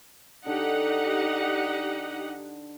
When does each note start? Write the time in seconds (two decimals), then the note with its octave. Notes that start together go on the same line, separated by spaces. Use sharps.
0.46 D3 D#4 G4 F#5